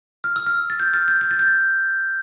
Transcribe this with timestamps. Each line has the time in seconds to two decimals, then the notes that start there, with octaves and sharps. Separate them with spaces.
0.24 F6
0.36 E6
0.46 F6
0.70 A6
0.80 G6
0.94 F6 A6
1.08 G6
1.21 G6
1.31 A6
1.39 G6